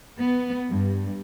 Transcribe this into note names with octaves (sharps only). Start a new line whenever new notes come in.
B3
G2